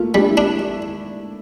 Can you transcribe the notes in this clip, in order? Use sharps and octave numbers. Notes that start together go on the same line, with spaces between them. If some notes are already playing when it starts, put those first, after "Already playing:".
Already playing: A3 A#3 F4
G3 D4
E4
D4